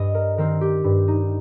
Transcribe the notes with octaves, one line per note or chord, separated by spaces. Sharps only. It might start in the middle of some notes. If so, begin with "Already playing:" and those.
Already playing: G2 D#5
A#4
D#3 C4 A#4
G4
G2
D#4